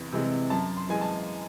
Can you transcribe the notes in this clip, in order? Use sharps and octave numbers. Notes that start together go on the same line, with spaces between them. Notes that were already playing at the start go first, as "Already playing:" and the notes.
Already playing: E2 C3
C3 E3 G#3
F#2 A5
C6
E3 G#3 G#5
A5